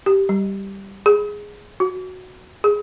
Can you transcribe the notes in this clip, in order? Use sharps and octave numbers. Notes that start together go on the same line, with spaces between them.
G4
G3
G#4
F#4
G#4